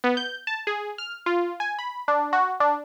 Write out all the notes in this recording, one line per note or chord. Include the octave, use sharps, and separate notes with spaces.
B3
G6
A5
G#4
F6
F4
G#5
B5
D4
F#4
D4